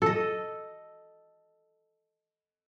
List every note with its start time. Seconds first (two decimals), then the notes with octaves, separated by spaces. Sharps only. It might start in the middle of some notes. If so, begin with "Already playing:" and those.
0.02 A4 D#5